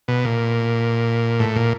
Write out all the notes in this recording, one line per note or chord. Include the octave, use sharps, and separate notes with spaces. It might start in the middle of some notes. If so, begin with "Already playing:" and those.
B2
A#2
A2
A#2